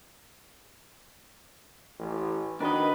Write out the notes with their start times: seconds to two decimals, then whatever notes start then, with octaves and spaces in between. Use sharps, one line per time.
1.99 A1
2.60 D#3 D4 F#4 B4 D#5 B5